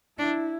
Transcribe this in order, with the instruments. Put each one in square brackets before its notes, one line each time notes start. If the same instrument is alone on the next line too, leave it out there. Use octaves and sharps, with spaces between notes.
[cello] D4 [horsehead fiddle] E4